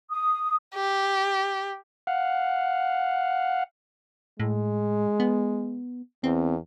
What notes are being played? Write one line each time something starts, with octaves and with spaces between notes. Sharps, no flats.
D#6
G4
F5 F#5
A2 G#3
B3
E2 C4